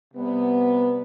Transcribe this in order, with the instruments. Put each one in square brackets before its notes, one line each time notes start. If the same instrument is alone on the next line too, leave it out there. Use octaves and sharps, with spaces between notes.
[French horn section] C3 G3 B3